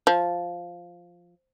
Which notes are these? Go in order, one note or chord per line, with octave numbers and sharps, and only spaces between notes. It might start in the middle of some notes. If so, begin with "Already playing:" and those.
F3